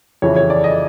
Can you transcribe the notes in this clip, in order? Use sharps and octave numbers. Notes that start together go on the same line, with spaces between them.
F2 C#3 E3 C#5
C#5
D5
D#5